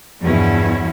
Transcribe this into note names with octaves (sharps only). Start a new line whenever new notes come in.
E2 G2 B2 F3 C#4 E4